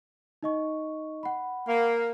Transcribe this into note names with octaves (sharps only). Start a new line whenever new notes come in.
D#4 D#5 C#6
F#5 B5
A#3